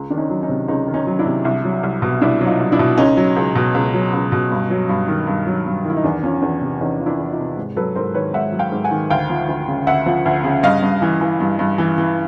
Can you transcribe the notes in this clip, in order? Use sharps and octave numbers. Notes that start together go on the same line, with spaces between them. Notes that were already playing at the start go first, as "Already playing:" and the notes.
Already playing: C#2
D#3 D4
C#4 D#4
F#3
C#4 D#4
C3
C#2 C#4 D#4
D#3
C#4 D#4
F#3
D4 E4
C3
C2
F#3
C2
B2
C2 D4 E4
F#3
D#4 F4
C2
D4 E4
B2
C#2 C#4 D#4
F#3
C#2
B2
C#2
F#3
C#2
B2
G2
F#3
G2
D#3
G2
F#3
G2
D#3 E4
D#4
E2 D4
F3 C#4
E2 D4
C3
E2 C#4 D#4
F3
D4 E4
E2
D#4 F4
C3
G#2
F#3 A4 B4
G#2 A#4 C5
D#3 B4 C#5
G#2 E5 F#5
F#3
F5 G5
G#2
F#5 G#5
D#3
D2 F5 G5
F3
D2
C#3
D2 E5 F#5
F3
D2
C#3
G2 D#5 F5
G2
E3
E3
G2
G2
E3
E3